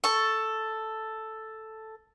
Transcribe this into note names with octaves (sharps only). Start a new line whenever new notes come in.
A4 C#6